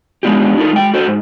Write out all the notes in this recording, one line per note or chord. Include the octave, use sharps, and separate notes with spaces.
G#3 B3 D4 F4 G4
D#4 F4 A4 A#4
G#3 G5
F#4 A4 C5
G#2